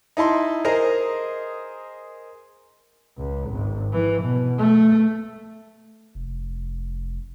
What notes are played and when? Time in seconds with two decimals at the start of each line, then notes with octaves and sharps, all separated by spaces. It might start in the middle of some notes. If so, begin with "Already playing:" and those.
0.17 D#4 E4 A5 C6
0.65 G#4 A#4 C5 D#5 A#5
3.18 C#2
3.50 G#1
3.92 E3
4.23 B2
4.59 A3
6.15 F1